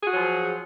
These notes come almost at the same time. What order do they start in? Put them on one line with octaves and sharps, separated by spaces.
G#4 F#4 F#3 F3